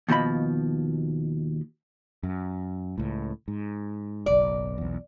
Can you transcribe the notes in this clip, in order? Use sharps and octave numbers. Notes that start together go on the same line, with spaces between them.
D#2 B2 F3 D#5 B5
F#2
C#2 A2
G#2
F#1 B1 D5
B1 E2